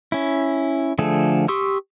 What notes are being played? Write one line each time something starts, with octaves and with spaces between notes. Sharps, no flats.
C#4 E4
D3 F3 A3 G#4 A4
G4 C6 C#6 D#6 E6